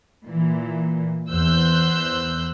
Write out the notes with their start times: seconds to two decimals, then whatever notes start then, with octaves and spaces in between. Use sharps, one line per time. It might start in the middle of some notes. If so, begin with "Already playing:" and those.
0.24 A#2 E3
1.29 E2 E3 C5 E6 F#6 G6